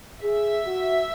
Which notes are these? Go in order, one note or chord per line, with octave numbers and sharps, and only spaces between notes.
G#4 E5
F#4